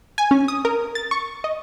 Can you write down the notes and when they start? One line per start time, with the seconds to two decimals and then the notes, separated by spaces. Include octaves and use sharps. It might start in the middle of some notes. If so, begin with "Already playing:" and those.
0.18 G#5
0.31 C#4
0.48 D#6
0.65 A#4
0.95 A6
1.11 C#6
1.44 D#5